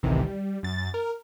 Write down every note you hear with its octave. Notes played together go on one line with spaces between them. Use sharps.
A1 D2 A2 C3 D#3 E3
G3
F#2 A6
A#4